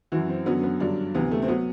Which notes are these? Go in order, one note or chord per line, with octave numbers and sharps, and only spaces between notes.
F#2 E3 F#4
C4
F#2 D3 F#3 B3
B3
G2 D3 F#3 D4
D2 C3 E3 B3
A3
C4
F#3 B3